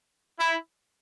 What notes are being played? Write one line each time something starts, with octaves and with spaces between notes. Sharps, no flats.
E4